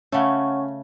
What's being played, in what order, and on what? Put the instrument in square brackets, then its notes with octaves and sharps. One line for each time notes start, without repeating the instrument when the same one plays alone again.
[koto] C#3 A3 [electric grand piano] C#4 [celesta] C#5 F#5 C#6